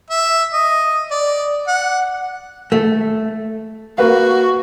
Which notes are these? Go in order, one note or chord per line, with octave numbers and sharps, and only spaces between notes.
E5
D#5
D5
F#5
A3
A#3 F#4 B4 F5